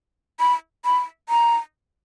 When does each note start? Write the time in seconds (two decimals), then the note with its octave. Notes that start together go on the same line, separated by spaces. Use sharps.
0.40 B5
0.85 B5
1.29 A#5